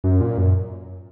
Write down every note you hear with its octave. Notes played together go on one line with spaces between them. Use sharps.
F#2
A#2
F#2